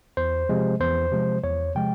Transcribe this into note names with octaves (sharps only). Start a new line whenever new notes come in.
E2 C5
C3 F3 G#3
E2 C5
C3 F3 G#3
E2 C#5
C3 F3 G#3 G5